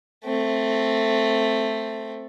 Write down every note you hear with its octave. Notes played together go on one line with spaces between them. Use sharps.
A3 C4